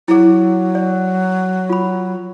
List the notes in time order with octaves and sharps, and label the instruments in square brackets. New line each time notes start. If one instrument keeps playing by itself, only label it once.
[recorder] F#3 [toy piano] E4 G#4
[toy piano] D5
F4 B5